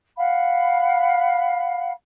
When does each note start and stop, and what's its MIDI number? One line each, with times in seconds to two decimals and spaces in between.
0.17 1.90 77
0.17 1.90 78
0.17 1.90 83